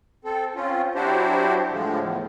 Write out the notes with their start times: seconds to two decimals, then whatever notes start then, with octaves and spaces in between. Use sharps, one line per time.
0.24 C4 A4
0.55 C4 C#4 F4
0.95 F#3 D4 E4 F#4 G4 C5
1.71 A2 D3 F3 G#3
2.02 E2 A2